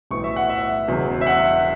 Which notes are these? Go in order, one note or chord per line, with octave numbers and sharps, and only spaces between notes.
B1 A2 E3 A3 C#6
E5
F#5
E5
E1 E2 C#3 F#3
E5
F#5